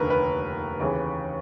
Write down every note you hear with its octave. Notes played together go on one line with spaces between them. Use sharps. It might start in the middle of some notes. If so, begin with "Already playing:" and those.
Already playing: F1 D#2 D3 A#4 B4
B4
D#2 C#3 E3